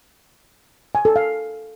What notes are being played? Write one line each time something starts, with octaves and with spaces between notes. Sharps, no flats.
G#5
A4
F5